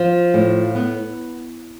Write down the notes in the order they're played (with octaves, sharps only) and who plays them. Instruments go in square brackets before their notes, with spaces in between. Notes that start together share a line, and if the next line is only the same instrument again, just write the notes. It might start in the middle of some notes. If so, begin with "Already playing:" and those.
Already playing: [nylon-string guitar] F3
A2
B3